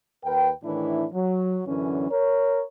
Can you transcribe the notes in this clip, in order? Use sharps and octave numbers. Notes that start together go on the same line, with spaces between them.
D#2 A#4 B4 G5
A2 D#3 E3 D4 E4
F#3
F#2 D3 E3 C#4
A#4 C#5